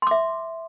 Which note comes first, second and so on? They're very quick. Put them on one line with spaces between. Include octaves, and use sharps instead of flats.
C6 D6 E5